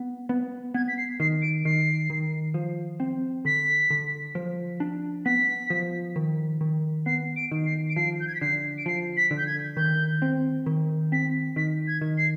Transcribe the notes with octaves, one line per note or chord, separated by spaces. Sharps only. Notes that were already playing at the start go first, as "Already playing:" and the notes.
Already playing: B3
B3
B3 G#6
B6
C7
D#3 C7
D7
D#3 C7
D#3
F3
C4
D3 B6
D3
F3
D4
B3 B6
F3
D#3
D#3
B3 C7
D7
D#3
C7
D7
F3 C7
G6
G#6
B6
D3 C7
D7
F3 C7
B6
D3
G6
G#6
D#3 G6
C4
D#3
C4 B6
D#3 B6
G#6
D#3
C7